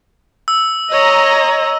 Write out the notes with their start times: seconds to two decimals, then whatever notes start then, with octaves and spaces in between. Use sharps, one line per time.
0.48 E6
0.93 C#5 D#5 A#5